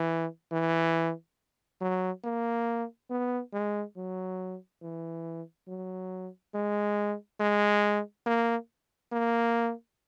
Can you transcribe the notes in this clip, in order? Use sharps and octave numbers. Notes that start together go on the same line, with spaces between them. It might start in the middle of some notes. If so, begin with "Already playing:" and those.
Already playing: E3
E3
F#3
A#3
B3
G#3
F#3
E3
F#3
G#3
G#3
A#3
A#3